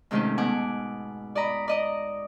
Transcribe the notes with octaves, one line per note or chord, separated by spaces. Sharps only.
G#2 C3 D#3 A3 C#4 A4
B2 F#5 G#5 D6
D5 D#5 A#5 B5
D5 D#5 A#5